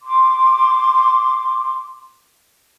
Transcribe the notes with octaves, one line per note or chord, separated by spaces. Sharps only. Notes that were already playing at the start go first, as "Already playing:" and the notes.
C6 D6